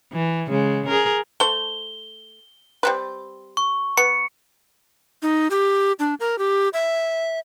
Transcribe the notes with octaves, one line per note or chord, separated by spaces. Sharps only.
E3
C#3 G#3
G#4 A#4
A3 C5 G7
G3 C4 B4
C#6
B3 C#7
D#4
G4
D4
A#4
G4
E5